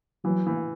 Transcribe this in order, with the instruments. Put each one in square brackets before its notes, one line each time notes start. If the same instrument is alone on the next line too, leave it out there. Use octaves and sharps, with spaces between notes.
[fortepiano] E3 [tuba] F#3
[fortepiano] E3